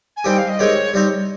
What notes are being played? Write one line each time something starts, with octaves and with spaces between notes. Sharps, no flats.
G#5
D#3 G3 C4 G4 G5
F5
D#5
D#3 G#3 C4 G4 C#5
G3 C4 D#4